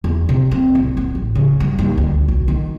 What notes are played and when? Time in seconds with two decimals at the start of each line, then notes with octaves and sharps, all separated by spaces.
0.04 E2
0.29 C3
0.51 C4
0.75 C2
0.97 B3
1.15 A1
1.35 C#3
1.60 G2
1.79 D#2
1.98 D2
2.28 B1
2.48 D#3